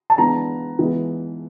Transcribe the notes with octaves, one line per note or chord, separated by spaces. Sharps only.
A5
E3 G#3 B3 D4 A#5
E3 G#3 B3